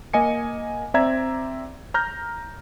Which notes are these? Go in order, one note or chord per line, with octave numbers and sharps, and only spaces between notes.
A#3 D#5 G#5 C#7
C4 D5 E5 A#5 G#6
A#5 F6 G6 A#6